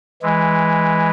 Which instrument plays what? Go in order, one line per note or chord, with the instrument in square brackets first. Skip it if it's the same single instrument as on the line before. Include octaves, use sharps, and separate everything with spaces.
[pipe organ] E3 G#3